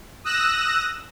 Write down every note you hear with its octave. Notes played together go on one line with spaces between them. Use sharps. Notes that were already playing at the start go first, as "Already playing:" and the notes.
D#6 E6 F#6 A#6 E7